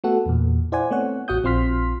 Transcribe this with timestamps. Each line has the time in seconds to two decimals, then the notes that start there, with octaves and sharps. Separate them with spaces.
0.04 A3 B3 F#4 A4 F#5
0.26 E2 A#2
0.72 E4 C5 D5 F#5 G#5
0.91 A3 B3 C4 C#5 F#5
1.28 A1 F#4 F#5 D#6 G6
1.44 A#1 C4 F4 C6 F6 B6